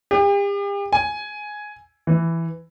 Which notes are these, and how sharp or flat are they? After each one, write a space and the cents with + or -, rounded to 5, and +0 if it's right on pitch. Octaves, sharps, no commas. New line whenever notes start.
G4 +40
G#5 +5
E3 +5